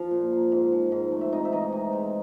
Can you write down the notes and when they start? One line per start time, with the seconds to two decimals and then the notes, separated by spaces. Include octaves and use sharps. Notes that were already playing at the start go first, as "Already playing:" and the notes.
Already playing: F3 F4 F5
0.11 A#2
0.32 A#3
0.52 G#2
0.72 F3
0.92 G#2
1.12 A3
1.21 E5
1.32 C3 D#4 D#5
1.45 E5
1.52 E3 D#4 D#5
1.73 C3
1.93 G#3